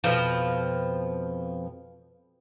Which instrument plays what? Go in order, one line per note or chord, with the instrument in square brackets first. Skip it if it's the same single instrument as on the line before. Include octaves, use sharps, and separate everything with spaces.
[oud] F2 B2 F3